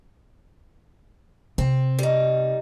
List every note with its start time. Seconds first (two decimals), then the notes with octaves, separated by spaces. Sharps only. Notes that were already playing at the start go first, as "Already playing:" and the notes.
1.58 C3 C4
1.99 G3 D#4